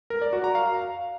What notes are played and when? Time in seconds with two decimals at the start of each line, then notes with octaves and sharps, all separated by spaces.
0.10 A#4
0.22 D5
0.33 F#4
0.44 A#5
0.55 F5